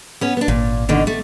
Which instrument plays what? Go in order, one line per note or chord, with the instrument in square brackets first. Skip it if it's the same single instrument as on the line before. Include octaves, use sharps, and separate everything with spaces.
[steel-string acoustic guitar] B3 C#4
B3 D4
[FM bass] G#1 [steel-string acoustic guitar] A#2
[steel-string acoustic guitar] B2 D3 D#3
A3